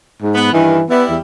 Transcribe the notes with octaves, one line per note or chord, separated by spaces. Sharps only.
G#2
B3
G2 D#3 E3
G3 B3 E4
E2